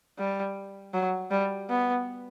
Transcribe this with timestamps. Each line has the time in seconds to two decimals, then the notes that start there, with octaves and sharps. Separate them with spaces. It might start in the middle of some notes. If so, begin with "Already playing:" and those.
0.18 G3
0.93 F#3
1.31 G3
1.69 B3